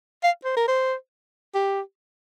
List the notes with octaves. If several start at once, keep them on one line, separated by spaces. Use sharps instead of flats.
F5
C5
A#4
C5
G4